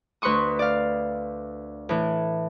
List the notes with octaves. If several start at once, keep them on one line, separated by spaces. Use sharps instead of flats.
D2 B4 C6 C#6 D#6
D5 F5
A2 E3